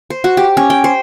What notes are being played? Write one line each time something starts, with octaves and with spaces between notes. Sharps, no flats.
C5
F#4
G4
C#4
G5
C5